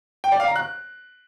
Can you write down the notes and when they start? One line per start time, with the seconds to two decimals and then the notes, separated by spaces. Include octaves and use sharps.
0.24 G5
0.32 D5
0.40 F5
0.48 A#5
0.56 F#6